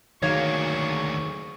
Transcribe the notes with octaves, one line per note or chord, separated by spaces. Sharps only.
D2 D#3 F#3 A#3 G#4 C#5 F5 C#6